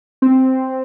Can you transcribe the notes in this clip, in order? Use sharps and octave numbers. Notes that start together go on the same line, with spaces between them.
C4